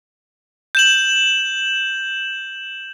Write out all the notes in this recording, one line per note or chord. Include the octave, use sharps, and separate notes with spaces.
G6 E7 F#7